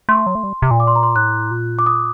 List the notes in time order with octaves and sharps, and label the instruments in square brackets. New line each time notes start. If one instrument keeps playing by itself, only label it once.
[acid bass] A3 [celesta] C6
[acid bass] F#3
A3
G3
C3
A#2
[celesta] D6
C6
A#5
C6
[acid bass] A2 [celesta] F#6
[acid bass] A#2
[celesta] D6
D#6